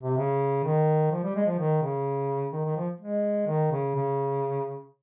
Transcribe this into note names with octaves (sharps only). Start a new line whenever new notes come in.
C3
C#3
D#3
F3
G3
G#3
F3
D#3
C#3
D#3
D#3
F3
G#3
D#3
C#3
C#3